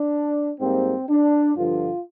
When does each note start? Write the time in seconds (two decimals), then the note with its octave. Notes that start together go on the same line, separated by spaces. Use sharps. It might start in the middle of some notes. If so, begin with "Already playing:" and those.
Already playing: D4
0.60 G#2 G3 A#3 C4
1.09 D4
1.56 G2 D3 F3 F4